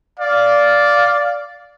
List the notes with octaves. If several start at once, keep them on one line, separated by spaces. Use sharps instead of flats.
D5 F5